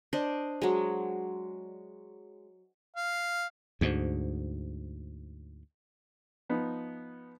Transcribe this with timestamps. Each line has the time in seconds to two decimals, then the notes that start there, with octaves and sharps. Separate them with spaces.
0.13 D4 C5 D#5
0.62 F#3 G#3
2.96 F5
3.81 D2 G#2
6.49 F3 B3 D#4